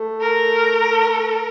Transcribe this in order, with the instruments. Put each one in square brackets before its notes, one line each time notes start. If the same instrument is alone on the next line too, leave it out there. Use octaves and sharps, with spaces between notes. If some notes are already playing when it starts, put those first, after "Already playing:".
Already playing: [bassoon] A3
[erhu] A#4